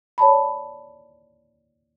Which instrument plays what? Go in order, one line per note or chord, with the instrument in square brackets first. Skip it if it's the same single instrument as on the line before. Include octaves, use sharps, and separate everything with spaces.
[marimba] C#5 D5 A5 B5